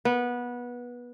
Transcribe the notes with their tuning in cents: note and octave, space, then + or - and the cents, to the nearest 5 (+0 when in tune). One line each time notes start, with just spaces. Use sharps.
B3 -20